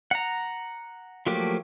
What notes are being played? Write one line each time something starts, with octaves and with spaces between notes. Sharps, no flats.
F#5 A#5
F3 F#3 A3 A#3 G4